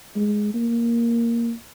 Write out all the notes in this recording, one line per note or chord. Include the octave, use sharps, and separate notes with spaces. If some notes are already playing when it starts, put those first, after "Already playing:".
G#3
A#3